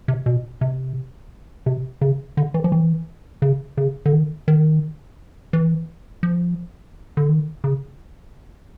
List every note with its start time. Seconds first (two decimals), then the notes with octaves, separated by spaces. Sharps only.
0.08 C3
0.26 B2
0.61 C3
1.66 C3
2.01 C#3
2.37 D3
2.54 E3
2.64 F3
2.72 E3
3.42 C#3
3.77 C#3
4.06 D3
4.13 D#3
4.48 D#3
5.53 E3
6.23 F3
7.17 D3
7.29 D#3
7.64 C#3